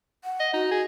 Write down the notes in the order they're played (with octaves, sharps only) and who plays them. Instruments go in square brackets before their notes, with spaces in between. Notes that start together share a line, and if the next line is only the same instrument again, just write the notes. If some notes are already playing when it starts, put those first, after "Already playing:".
[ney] F#5
[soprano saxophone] D#5
[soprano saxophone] D#4 [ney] F#4
[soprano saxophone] G#4